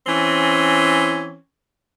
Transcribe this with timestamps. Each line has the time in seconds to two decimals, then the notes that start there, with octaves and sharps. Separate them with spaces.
0.07 E3 C4 C#4